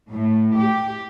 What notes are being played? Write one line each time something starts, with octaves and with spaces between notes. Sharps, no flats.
A2
G4